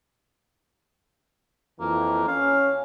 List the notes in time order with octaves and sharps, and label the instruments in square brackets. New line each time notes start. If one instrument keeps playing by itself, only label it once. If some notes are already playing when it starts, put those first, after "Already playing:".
[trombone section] F2 E3 [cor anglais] A#3
[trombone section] C#4 [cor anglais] F5